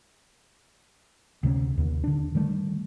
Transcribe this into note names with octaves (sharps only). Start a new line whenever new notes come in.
D2 C3 A#3 C#4
D#2
D3 D4
D#3 G3 A3